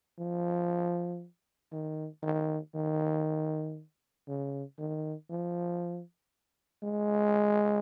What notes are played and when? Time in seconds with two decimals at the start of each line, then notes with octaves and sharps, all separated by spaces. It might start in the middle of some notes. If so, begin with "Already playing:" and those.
0.19 F3
1.72 D#3
2.23 D#3
2.75 D#3
4.28 C#3
4.79 D#3
5.30 F3
6.83 G#3